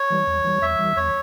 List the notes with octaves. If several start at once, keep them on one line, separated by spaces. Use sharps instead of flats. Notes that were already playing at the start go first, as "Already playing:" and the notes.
Already playing: C#5
E3 G3
E2
E3 G3
E2 E5
E3 G3
E2 C#5